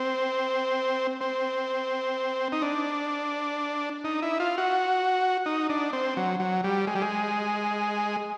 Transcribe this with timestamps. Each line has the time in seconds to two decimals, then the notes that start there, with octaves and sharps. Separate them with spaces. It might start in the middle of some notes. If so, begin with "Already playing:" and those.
Already playing: C4
1.21 C4
2.52 D#4
2.62 D4
4.04 D#4
4.22 E4
4.40 F4
4.58 F#4
5.46 D#4
5.69 D4
5.93 C4
6.17 F#3
6.40 F#3
6.64 G3
6.87 G#3
6.95 G3
7.02 G#3